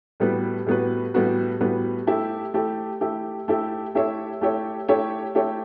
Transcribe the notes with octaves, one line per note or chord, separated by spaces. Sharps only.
A2 G3 B3 F#4 B4
A2 G3 B3 F#4 B4
A2 G3 B3 F#4 B4
A2 G3 B3 F#4 B4
A3 E4 G4
A3 E4 G4
A3 E4 G4
A3 E4 G4
A3 E4 G4 C#5 E5
A3 E4 G4 C#5 E5
A3 E4 G4 C#5 E5
A3 E4 G4 C#5 E5